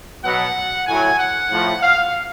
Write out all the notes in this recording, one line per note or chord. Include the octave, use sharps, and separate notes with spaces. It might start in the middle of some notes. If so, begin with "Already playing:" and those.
B2 F#3 F#5
A2 F#3 G#5
F#5
A2 F3
F5